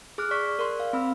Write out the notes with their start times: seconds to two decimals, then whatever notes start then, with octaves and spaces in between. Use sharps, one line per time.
0.18 G#4 D6 F6 F#6
0.31 D5 C#6 B6
0.59 A#4 D5 C6
0.80 F5
0.93 C4 B5 E6